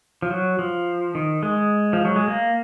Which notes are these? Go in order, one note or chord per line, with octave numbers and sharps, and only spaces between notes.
F3
F#3
F3
D#3
G#3
F3
F#3
G#3
A#3